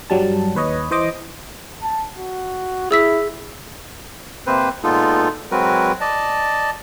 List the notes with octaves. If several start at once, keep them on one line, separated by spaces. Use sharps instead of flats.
G2 F#3 G3 A5
D#2 B4 C#5 D#5
E3 C5 D#5 D6
A5
F#4
E4 G#4 E6 B6
C3 A#3 C4 B4 C5
A#2 G#3 B3 D#4 F4 A4
F#3 G#3 C4 F#4 A#4 B4
D5 D#5 A5